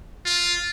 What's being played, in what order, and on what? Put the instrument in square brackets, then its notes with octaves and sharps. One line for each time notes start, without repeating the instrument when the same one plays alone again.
[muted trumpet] F4